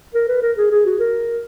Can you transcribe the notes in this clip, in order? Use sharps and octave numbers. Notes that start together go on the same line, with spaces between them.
A#4
B4
A#4
G#4
G#4
F#4
A#4